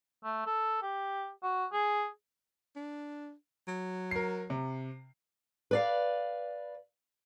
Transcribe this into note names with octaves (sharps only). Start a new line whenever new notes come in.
A3
A4
G4
F#4
G#4
D4
F#3
A#4 C7
C3
B4 D5 F5